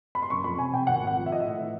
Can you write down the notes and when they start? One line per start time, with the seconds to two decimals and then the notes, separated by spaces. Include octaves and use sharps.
0.15 B5
0.22 C6
0.30 F#1 C#6
0.44 F2 B5
0.58 C3 G#5
0.73 C3 G5
0.87 G#1 F#5
1.02 G#1 F#5
1.16 F3
1.26 E5
1.31 F3 D#5
1.40 A2 E5
1.59 E3